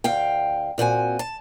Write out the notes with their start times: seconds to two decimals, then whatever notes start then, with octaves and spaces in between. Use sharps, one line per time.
0.04 D2 F5 G5
0.78 A#2 C4 F#4 G#5
1.19 A5